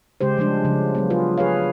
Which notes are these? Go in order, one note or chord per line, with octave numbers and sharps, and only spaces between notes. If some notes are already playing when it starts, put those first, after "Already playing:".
C#3 G#3 G4 C5
F3 G3 G#3 D4
C#3 F3
F#3 G#3 B3
F4 G#4 B4
G#4 B4 C#5 F5